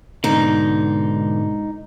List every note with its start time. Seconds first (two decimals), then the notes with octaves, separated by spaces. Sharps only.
0.24 G#2 B2 D3 D#4